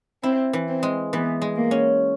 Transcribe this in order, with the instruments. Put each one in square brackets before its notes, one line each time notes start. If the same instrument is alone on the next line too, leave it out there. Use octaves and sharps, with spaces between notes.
[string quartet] C4 [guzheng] E4
[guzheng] E3
[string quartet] C4
[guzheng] G#3
[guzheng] E3 [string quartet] B3
[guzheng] G#3
[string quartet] A#3
[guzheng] C#4